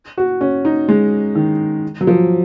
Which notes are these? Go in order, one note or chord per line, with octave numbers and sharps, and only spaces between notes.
F#4
C#4
D#4
G#3
D#3
F#3
F3